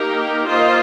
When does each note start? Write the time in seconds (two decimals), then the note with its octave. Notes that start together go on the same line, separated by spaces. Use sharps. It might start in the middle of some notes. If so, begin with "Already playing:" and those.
Already playing: A#3 D#4 G4 A#4
0.47 A#3 F4 C5 D#5